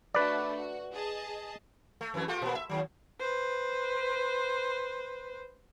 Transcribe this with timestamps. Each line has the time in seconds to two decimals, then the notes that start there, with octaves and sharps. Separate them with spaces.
0.14 A3 D4 F#4 B4 D5
0.54 F#4
0.94 G#4 D#5 A5
2.01 A3
2.14 F2 E3 A3
2.28 A3 F4 G4
2.42 A#2 A#3
2.55 E5
2.69 D#2 F3 F#3
3.19 B4 C5